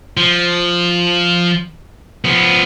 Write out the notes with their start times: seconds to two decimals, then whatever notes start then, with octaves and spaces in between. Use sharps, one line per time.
0.17 F3
2.25 F3 B3